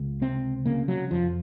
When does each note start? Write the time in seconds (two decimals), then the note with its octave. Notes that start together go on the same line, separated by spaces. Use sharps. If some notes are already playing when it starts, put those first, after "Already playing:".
Already playing: C#2
0.21 C3 C4
0.66 C#3 A#3
0.88 F#3
1.11 F2 F3